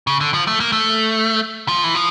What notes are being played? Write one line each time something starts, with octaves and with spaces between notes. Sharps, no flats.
C#3
D3
F3
A3
A#3
A3
F3
E3
F3